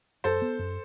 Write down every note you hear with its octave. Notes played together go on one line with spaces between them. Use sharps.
F#2 A4 C5
B3
F#2